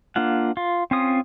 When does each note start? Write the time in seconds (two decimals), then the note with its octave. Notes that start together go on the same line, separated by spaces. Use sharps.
0.16 A#3 D4 F4 F#5
0.57 F4
0.91 C4 C#4 F4 D#6